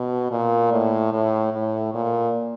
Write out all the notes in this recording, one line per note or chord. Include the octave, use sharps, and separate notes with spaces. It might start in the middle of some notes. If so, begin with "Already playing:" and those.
Already playing: B2
A#2
A2
A2
A2
A#2